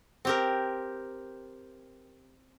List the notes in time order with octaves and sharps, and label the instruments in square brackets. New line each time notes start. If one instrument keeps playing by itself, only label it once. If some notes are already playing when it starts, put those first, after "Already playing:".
[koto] C4 G4 A#4